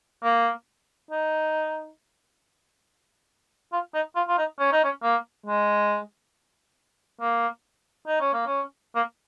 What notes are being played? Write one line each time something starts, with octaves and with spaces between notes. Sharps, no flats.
A#3
D#4
F4
D#4
F4
F4
D#4
C#4
D#4
C#4
A#3
G#3
A#3
D#4
C#4
A#3
C#4
A#3